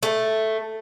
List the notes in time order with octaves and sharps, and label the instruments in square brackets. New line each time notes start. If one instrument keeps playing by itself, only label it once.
[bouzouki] A3